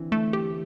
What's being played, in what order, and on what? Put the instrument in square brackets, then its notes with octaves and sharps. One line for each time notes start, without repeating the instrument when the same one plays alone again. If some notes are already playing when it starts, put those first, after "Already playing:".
Already playing: [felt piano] D3 E3 C4
[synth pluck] A3
G4